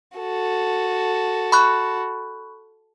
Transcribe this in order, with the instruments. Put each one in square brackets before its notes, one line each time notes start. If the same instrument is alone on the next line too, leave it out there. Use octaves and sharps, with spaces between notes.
[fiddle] F#4 A4
[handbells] B5 C#6 F#6